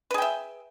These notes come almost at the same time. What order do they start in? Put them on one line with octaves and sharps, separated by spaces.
B4 G#4 G5 E5